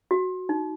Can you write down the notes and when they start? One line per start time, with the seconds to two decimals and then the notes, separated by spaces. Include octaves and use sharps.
0.11 F#4
0.49 D#4